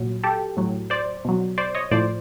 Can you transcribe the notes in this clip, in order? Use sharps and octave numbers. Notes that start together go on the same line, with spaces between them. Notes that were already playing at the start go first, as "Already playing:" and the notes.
Already playing: A#2 F#3
G4 A4
A2 F#3
C5 D5
B2 F#3
C5 D5
C#5 D#5
A2 F3 C5 D5